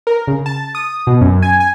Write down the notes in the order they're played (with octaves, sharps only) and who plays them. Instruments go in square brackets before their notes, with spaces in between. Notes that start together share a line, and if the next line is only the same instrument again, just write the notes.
[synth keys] A#4
C#3
A5
D#6
B2
F#2
G#5
G#5